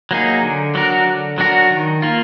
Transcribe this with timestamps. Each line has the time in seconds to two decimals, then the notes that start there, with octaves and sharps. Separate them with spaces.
0.11 F#3 A#3 D#4 G#4
0.43 D3
0.75 F#3 D4 F#4 A#4
1.06 D3
1.38 F#3 D4 F#4 A#4
1.71 D#3
2.02 A#3 F4